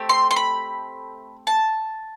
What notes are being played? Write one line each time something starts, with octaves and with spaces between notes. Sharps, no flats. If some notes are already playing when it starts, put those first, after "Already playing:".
Already playing: A3 C4 G4
C6
C6
B5
A5